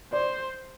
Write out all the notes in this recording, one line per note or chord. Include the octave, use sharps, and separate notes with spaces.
C5 D5